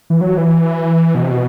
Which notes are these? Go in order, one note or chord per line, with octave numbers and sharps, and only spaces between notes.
E3
F#3
E3
B2
C3
B2